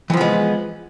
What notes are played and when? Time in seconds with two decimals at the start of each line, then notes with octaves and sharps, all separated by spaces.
0.10 E3
0.13 F3
0.17 B3
0.21 G#3